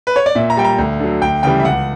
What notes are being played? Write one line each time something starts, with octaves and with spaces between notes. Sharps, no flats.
B4
C#5
D5
A#2 E5
A#5
G3 G5
A#5
D2
D3 F#3
D2 G5
C#3 E3 G3 G5
E5
C#2 F#5